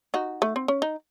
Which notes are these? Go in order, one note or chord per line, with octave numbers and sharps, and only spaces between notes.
D#4 F#4
A3
C4
C#4
D#4